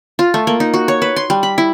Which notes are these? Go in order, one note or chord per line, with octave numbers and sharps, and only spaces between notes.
F4
A3
A#3
D#4
F#4
C#5
B4
C6
G3
B5
E4